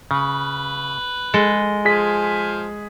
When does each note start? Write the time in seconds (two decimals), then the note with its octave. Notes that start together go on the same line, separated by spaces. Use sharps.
0.11 C#3 B4
1.34 G#3 A4
1.85 F3 G#4 G#5 B6